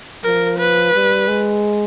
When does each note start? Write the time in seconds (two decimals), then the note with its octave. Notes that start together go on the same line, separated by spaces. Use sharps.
0.24 F3 A#4
0.59 B4
0.93 G3
1.27 G#3